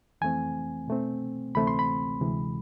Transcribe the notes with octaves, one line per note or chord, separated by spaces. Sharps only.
F2 E3 A3 C4 G#5
B2 A3 C4
D2 C3 E3 A3 C4 B5
C6
B5
D2 C3 E3 G#3